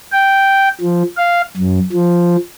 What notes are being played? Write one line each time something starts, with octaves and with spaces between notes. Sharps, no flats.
G5
F3
F5
F#2
F3